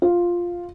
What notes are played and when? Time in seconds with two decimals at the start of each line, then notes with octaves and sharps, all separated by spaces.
0.02 F4